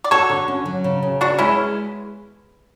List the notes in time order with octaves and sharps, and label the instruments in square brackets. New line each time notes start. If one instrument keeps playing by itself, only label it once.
[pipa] D5
[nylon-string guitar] F#4 [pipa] A4 C#5
[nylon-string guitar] D3
C#4
F#3
C#3
C#3
[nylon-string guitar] B3 [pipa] D4 F#4
[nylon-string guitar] G#3 [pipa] C#4 E4